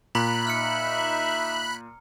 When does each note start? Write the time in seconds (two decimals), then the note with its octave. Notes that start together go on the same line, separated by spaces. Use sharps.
0.15 A#2 A#5 B5 F#6
0.47 D#4 E5 F6 C#7